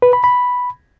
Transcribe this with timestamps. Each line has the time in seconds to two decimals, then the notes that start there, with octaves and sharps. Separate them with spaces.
0.02 B4
0.13 B5
0.24 B5